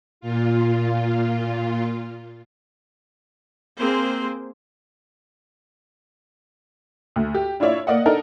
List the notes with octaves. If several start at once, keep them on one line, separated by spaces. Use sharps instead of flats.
A#2 F4
A#3 C4 G#4 C5
D2
G4
D4 E4 F4 C#5 D5 E5
A#3 D5 D#5 F#5
D4 D#4 A4 A#4